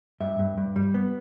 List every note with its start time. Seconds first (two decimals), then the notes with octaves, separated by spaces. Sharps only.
0.20 G2 E5
0.39 G2
0.57 G2
0.76 G3
0.94 B3